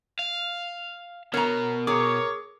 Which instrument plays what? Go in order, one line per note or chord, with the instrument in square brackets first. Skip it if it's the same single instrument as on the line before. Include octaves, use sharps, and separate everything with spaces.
[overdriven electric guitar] F5
[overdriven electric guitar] B2 B3 [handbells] A#4 [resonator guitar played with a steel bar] C#5 A#5
[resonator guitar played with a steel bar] G#4 [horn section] A#4 C#5 [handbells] D6